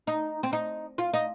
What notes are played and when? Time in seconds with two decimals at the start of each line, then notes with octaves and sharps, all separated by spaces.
0.07 D#4
0.43 C4
0.53 D#4
0.98 F4
1.13 D#4